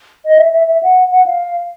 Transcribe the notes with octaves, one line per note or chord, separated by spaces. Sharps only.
D#5
E5
E5
E5
F#5
F#5
F5